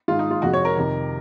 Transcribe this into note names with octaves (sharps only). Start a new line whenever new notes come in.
G#2 D#3 G#3 F4
D#4
F4
F2 C3 F3 G#3 F#4
C#5
A#4
F2 C3 D#3